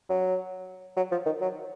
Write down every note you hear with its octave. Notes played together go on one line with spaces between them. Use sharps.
F#3
F#3
F3
D#3
F#3